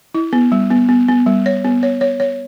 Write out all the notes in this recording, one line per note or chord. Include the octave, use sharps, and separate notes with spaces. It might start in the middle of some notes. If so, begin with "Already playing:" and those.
E4
B3
G3
B3
B3
B3
G3
C#5
B3
C#5
C#5
C#5